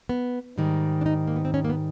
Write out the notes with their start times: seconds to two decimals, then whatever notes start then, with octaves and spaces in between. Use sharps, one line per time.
0.09 B3
0.58 G#2 D#3 G3
1.01 D4
1.06 D#4
1.27 A#3
1.36 B3
1.45 C4
1.54 C#4
1.65 A#3
1.69 B3